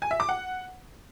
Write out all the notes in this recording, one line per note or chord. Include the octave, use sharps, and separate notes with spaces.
G#5
E5
D6
F#5